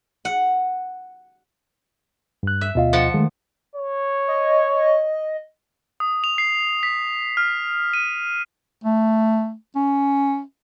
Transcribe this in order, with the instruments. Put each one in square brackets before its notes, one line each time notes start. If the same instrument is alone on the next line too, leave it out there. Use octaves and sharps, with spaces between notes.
[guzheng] F#5
[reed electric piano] G2 F#6
[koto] E5
[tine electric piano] D2 D#5 F5 [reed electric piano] B2 F4
[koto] F3 F#5 A5
[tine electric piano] D#3 A3 [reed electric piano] G#3
[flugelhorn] C#5
[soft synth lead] D#5
[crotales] D#6
F7
C7
B6
F6
D#7
[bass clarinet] A3
C#4